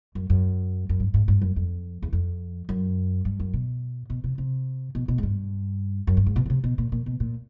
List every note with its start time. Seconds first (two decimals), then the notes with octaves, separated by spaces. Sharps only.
0.15 F#2
0.30 F#2
0.89 F#2
1.00 G2
1.14 G#2
1.28 G2
1.42 F#2
1.56 F2
2.02 E2
2.13 F2
2.69 F#2
3.25 G2
3.40 F#2
3.53 B2
4.10 B2
4.24 C3
4.38 C3
4.95 B2
5.08 B2
5.18 G#2
5.23 G2
6.07 F#2
6.17 G2
6.26 G#2
6.36 B2
6.46 C#3
6.50 C3
6.64 B2
6.78 A#2
6.92 A#2
7.06 B2
7.20 A#2